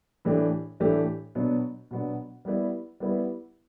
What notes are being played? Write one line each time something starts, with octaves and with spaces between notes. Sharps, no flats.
A2 E3 A3 D4 G4
A2 E3 A3 D4 G4
B2 F#3 B3 D4
B2 F#3 B3 D4
G3 B3 E4 B4 D5
G3 B3 E4 B4 D5